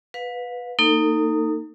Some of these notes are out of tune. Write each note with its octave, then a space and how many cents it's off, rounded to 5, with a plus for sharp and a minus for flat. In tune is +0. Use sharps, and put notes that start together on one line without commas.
B4 +0 F5 +35
A#3 -25 D#4 -5 A4 +35